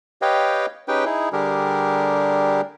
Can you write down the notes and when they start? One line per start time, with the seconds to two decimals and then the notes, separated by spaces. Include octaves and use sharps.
0.22 G4 B4 C#5 D#5 F5 G5
0.88 C#4 D#4 G4 G#4 B4 G5
1.05 D#4 E4 G#4
1.33 D3 G3 D4 G4 G#4 A#4